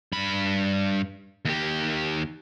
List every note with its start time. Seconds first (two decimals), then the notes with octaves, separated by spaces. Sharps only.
0.13 G2 B5
1.45 D#2 G4